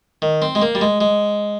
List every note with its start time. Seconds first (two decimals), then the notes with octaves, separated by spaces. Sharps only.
0.22 D#3
0.42 C4
0.55 G#3
0.62 A#3
0.75 G3
0.81 G#3
1.01 G#3